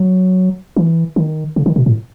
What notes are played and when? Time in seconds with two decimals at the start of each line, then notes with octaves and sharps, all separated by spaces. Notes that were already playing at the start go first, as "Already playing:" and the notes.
Already playing: F#3
0.76 E3
1.16 D#3
1.56 C#3
1.66 D#3
1.76 B2
1.86 A2